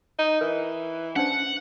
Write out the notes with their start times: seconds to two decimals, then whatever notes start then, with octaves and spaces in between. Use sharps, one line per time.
0.19 D#4
0.41 E3 A#4
1.16 C#4 D4 C5 F#5